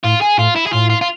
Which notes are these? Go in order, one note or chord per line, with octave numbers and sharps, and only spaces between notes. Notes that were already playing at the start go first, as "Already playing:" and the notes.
A2 F4
G#4
A2 F4
E4
G#4
A2 F4
F4
F4